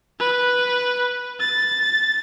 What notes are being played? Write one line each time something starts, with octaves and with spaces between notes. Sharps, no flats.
B4
A6